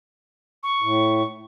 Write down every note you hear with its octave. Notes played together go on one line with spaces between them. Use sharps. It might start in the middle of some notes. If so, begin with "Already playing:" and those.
C#6
A2